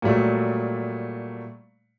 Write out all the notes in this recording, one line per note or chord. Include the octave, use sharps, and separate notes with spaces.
A#2 F#3 G3 A3